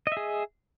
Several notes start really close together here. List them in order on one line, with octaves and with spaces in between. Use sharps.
D#5 E5 G#4